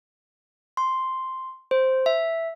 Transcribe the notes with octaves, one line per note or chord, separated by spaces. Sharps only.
C6
C5
E5